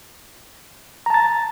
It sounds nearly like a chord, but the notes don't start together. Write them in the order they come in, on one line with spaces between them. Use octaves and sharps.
A#5 A5 A6